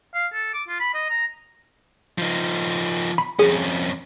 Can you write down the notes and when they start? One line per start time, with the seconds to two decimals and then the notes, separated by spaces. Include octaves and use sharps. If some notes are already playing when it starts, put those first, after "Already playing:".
0.15 F5
0.33 A4
0.54 D6
0.68 F4
0.80 B5
0.94 D#5
1.10 A#5
2.18 F3 D#4
3.18 B5
3.39 F2 C#4 G#4